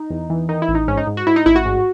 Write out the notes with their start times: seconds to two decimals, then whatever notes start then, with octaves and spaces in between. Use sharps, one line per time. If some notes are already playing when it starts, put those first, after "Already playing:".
Already playing: D#4
0.10 E2
0.30 E3
0.49 D#3 D#4
0.62 E4
0.68 A1
0.75 D#4
0.88 G#2 C#4
0.97 D#4
1.07 G#2
1.17 F#4
1.27 G#2 E4
1.36 D#4
1.46 A1 E4
1.56 F#4
1.66 G#2